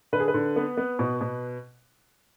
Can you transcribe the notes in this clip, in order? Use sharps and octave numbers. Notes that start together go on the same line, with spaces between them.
D3 B4
G#4
B4
D3
B3
B3
B2
B2